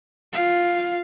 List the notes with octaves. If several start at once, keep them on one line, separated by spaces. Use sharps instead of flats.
F4 F5